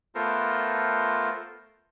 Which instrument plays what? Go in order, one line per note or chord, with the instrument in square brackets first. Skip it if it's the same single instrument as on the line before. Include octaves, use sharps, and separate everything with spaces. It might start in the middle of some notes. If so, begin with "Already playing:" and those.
[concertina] A3 B3 F4 A4 A#4 C5